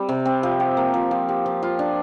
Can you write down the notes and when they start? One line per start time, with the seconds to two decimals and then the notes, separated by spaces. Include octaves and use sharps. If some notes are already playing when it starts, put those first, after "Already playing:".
Already playing: G3 C4
0.09 C3
0.25 C4
0.43 F3
0.60 G4
0.77 A#3
0.94 F3
1.11 F3
1.29 G4
1.46 F3
1.63 F4
1.79 D4